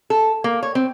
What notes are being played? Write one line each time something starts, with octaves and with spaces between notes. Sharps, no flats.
A4
A#3
C#5
C4